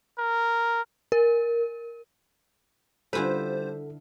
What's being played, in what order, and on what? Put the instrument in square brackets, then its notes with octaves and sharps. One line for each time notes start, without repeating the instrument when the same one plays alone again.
[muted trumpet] A#4
[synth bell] A#4
[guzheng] D3 E4 B4 [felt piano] G3 F4 [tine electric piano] A4 [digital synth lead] C5